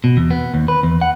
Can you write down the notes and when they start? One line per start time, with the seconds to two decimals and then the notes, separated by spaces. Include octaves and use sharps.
0.04 B2
0.17 E2
0.31 B3
0.54 D#2
0.68 B4
0.83 E2
1.01 F#5